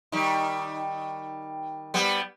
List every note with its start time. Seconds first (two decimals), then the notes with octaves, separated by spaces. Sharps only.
0.12 D#3 G3
1.94 G3 B3